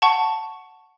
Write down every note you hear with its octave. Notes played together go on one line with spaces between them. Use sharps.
F#5 A5 C#6